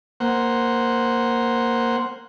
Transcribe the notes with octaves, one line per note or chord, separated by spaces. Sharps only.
A#3 C5 F#5